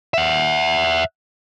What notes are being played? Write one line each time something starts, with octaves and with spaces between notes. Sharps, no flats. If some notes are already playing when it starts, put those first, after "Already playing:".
E5 F#5